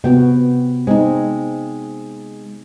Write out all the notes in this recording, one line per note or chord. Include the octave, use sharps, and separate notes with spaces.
C3 B3 F#4 G5
G#3 C4 D#4